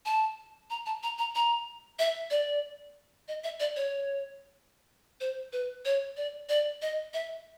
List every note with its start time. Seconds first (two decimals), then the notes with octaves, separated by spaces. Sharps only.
0.05 A5
0.70 A#5
0.86 A5
1.03 A#5
1.18 A#5
1.35 A#5
1.99 E5
2.31 D5
3.28 D#5
3.44 E5
3.60 D5
3.76 C#5
5.21 C5
5.53 B4
5.85 C#5
6.17 D5
6.49 D5
6.82 D#5
7.14 E5